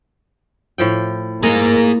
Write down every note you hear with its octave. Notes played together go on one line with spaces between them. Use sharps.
A2 F3 G5
A#3 G#4 D#5 A#5